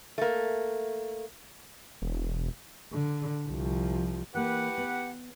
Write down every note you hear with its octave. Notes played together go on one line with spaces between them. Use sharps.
A3 A#3
E1
D3
C2 F3
E3 A#3 G4 B4 F#5
B3